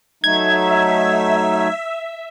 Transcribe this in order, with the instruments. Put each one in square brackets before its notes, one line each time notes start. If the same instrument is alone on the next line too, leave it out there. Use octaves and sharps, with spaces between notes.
[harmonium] F#3 A3 D#4 [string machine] E5 [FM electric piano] G#6